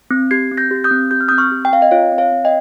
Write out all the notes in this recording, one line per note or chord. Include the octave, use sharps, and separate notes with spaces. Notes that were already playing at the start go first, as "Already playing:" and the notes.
C4
G4 G#6 C7
C4
G6 A#6
G4
D#6 G6
C4
G4 G6
F6
D#6 G6
C4
C#6 F6
G4
G5
C4 F5
D#5 G5
F4 C#5 F5
C4
C#5 F5
C4
D#5 G5